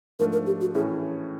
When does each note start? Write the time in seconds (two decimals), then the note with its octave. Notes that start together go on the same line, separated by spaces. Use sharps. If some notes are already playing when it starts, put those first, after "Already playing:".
0.19 G#2 F3 A3 D4 A#4
0.32 A#4
0.46 G4
0.61 F#4
0.75 A2 E3 A3 C#4 G#4